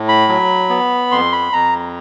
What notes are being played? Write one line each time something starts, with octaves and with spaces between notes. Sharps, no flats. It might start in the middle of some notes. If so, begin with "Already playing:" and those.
Already playing: A2
B5
F#3
B3
F2 C6
B5
F2 A#5